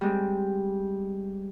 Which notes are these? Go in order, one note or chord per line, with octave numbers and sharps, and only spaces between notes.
G3 G#3 C4